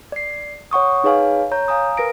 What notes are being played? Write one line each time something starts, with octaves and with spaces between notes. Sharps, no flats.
D5 C7
C#5 F#5 C#6 D#6
D#4 G#4 B4 C#5 F5 G#5
C#5 A#5 G6
F5 G#5 A#5 D#6
A#4 B4 A#6 D7